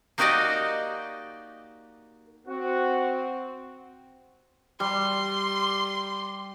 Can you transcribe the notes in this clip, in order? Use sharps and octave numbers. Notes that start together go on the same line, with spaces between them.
A#3 D#4 F#4 G4 D5 D#5
C4 F#4
G3 C6